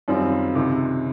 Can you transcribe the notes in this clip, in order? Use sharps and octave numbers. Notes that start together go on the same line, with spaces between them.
F#2 D#3 G3 C4 F4
C#2 C3 D#3